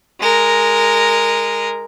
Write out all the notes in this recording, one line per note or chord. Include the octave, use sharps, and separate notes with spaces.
G#3 A#4